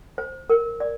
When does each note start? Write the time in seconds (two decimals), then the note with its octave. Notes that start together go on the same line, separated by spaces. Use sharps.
0.18 C5
0.50 A#4
0.80 D5